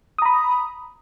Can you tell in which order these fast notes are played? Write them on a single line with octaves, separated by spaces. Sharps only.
D#6 A#5 B5